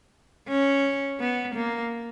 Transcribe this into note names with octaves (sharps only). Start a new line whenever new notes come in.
C#4
B3
A#3